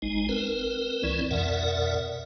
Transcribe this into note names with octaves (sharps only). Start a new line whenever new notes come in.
G#1 G#3 D#4
C4 A#4 B4
C#2 E3 C4 E4 D5
F2 B2 A#4 D5 E5 F#5